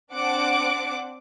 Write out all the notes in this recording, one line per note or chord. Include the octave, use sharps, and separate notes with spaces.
C4 D4 F#5 D6 D7